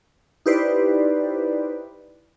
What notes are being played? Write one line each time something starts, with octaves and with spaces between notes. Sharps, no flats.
D#4 E4 G4 B4 C5 D5